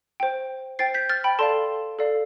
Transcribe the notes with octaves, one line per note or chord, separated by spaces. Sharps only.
C5 G5
C5 G5 A6 C7
G6 B6
F6 A6
G5 B5
A4 D5 F5 A5 C6
A4 D5 F5